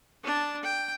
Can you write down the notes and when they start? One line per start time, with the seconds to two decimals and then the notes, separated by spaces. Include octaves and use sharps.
0.24 D4 A5
0.63 G5